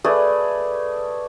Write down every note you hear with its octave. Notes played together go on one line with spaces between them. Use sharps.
A3 G#4 B4 D5